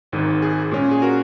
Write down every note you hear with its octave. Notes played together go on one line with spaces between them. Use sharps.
G#1 G#2 D#3
G#4
A#2 G#3 C#4
G#4
F#4 A#4